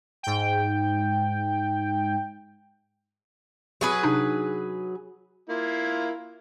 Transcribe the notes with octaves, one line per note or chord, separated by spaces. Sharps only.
G#2 G5
F#3 G#4 B4
C3 D4 D#4
A#3 E4 F4